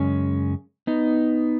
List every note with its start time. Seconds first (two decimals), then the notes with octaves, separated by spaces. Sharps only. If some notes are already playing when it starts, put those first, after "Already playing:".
Already playing: F#2 C#3 G#3 C#4
0.87 B3 D#4